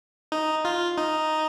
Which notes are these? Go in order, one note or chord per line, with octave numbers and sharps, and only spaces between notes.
D#4
F4
D#4